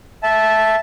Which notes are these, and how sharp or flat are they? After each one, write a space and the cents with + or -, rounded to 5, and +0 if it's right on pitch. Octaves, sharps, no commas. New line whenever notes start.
E5 +0 A5 -10